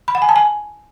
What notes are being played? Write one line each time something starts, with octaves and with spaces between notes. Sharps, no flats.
B5
F#5
G#5
A5
G#5